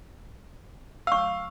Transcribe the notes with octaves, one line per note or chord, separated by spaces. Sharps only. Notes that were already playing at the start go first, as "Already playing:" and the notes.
F5 C#6 E6